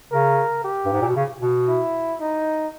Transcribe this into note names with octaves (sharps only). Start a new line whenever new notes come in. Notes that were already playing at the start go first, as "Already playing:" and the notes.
C#3 A#4
G4
G2
G#2
A#2
B2
C#3
B2
E4
D#4